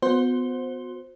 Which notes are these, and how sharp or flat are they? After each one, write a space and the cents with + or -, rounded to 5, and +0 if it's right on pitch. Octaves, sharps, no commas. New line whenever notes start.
B3 +25 F#4 -35 C5 +0